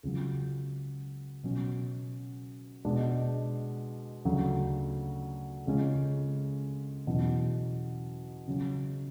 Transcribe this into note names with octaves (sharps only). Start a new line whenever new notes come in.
C#2 C#3 F#3
B2 F#3 C#4
B2 G#3 D4
D2 C#3 F#3
C#2 C#3 G#3 C#4
E2 B2 F#3 C#4 E4
C#3 F#3 C#4